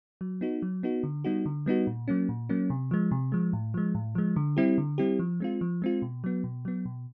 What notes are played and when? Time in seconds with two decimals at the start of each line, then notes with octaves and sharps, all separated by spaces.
0.21 F#3
0.41 B3 D#4 F#4
0.62 F#3
0.83 B3 D#4 F#4
1.03 D3
1.24 G3 B3 D#4 F#4
1.46 D3
1.66 G3 B3 D#4 F#4
1.87 A#2
2.08 F#3 A#3 C#4
2.29 A#2
2.49 F#3 A#3 C#4
2.70 C3
2.91 F3 G#3
3.11 C3
3.32 F3 G#3
3.53 A2
3.74 F3 G#3
3.95 A2
4.15 F3 G#3
4.36 D3
4.57 G3 C4 E4 G4
4.78 D3
4.98 G3 C4 E4 G4
5.19 F3
5.40 G#3 C4 F4
5.61 F3
5.82 G#3 C4 F4
6.02 B2
6.24 F#3 B3
6.44 B2
6.65 F#3 B3
6.86 B2